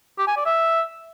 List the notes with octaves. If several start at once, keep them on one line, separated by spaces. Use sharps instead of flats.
G4
G#5
D5
E5